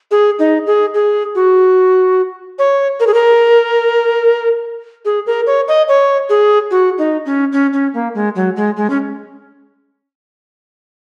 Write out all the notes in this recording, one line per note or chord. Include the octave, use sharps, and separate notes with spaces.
G#4
D#4
G#4
G#4
F#4
C#5
A#4
G#4
A#4
G#4
A#4
C#5
D#5
C#5
G#4
F#4
D#4
C#4
C#4
C#4
A#3
G#3
F#3
G#3
G#3
C#4